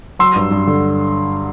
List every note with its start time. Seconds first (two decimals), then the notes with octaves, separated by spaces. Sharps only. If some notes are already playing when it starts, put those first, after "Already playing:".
0.19 F#3 C6 E6
0.36 G2
0.51 G2
0.67 D3